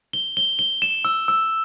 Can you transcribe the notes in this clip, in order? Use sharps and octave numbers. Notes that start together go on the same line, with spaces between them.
G7
G7
G7
E7
E6
E6